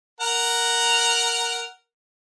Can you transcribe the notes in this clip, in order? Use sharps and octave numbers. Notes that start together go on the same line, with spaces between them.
A#4 F#5 A#5